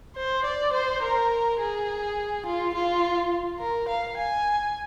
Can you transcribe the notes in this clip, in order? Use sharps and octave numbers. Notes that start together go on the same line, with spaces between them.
C5
D5
C5
A#4
G#4
F4
F4
A#4
F5
G#5